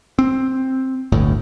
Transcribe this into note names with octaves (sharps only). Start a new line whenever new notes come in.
C4
G1 D2 A2